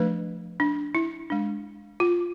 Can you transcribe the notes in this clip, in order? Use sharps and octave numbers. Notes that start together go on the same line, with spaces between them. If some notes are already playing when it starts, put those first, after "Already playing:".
Already playing: F3 A3 D4 B4
D4
E4
G#3 D4
F4